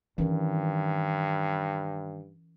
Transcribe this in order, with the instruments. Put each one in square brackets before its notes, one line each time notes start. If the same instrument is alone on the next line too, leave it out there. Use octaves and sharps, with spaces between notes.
[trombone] G2 [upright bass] D#3 [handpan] E3 C#4 A#4